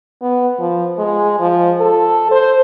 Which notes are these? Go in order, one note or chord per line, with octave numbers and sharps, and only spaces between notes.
B3
F3
G#3
F3
A4
C5